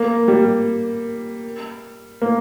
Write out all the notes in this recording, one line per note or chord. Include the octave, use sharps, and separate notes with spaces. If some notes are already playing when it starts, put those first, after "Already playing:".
Already playing: A#3
G3
A#3